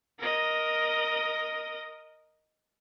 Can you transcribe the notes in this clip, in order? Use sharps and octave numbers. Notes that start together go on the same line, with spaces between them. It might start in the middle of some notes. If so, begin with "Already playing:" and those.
A#4 D#5